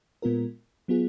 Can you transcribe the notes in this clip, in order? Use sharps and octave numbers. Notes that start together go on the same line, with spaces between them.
A#2 G#3 B3 F4 A#4
F#3 B3 F4 G#4